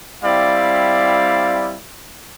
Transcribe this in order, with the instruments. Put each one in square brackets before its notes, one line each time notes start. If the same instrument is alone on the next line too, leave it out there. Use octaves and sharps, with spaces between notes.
[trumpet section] G3 C4 E4 D5 F5